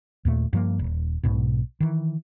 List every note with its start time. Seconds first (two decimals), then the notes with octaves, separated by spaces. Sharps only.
0.25 D#2 A#2 A3
0.53 G2 F3 A3 A#3
0.79 D#1
1.23 B1 G#2 B2
1.80 D#3 E3